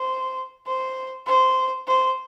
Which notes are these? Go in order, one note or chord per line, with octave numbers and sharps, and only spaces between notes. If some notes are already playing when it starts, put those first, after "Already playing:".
Already playing: C5
C5
C5
C5